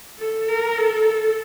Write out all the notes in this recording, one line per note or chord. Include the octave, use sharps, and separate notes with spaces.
A4
A#4
A4